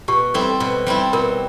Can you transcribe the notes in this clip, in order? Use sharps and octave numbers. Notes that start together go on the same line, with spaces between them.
B2 G4
G3 C4 E4 A4
B2
G3 C4 E4
B2 A#4